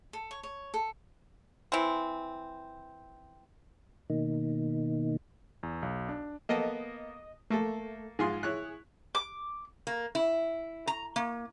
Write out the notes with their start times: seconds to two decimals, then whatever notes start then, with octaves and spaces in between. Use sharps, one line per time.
0.13 A4
0.31 C#5
0.43 C#5
0.74 A4
1.72 E3 C4
4.10 B2 D#3 A#3 D#4
5.63 E2
5.83 B1
6.09 D4
6.49 A#3 B3 A4 D#5
7.50 A3 A#3 A4
8.19 G#2 F4 G#4 C6
8.43 E4 C#5 F#6
9.15 D6
9.87 A#3
10.15 E4
10.87 A#5
11.16 A#3